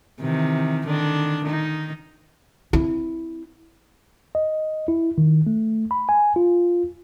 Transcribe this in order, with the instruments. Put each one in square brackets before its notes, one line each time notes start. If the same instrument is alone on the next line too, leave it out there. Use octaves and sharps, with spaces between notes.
[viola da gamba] C3 D#3 E3
D3 D#3 D4
D#3 D#4
[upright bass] C4 E4
[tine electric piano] D#5
E4
D#3
A3
B5
G#5
F4